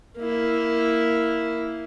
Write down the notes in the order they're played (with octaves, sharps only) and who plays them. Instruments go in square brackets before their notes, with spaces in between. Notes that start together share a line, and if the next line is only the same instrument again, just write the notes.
[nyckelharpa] A#3 E4